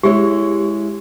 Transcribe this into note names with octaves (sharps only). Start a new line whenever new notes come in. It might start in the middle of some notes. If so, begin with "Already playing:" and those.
G#3 E4 G4 C#5